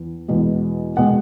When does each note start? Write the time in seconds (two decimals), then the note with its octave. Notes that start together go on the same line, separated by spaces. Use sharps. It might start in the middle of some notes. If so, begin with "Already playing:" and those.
Already playing: E2
0.28 E2 B2 G#3
0.97 B2 G#3 F#5